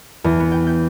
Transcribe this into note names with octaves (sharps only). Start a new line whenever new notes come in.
E2
B3
G5
G6